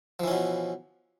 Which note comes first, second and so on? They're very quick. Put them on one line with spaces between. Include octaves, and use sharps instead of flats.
F3 E3 C#4 B2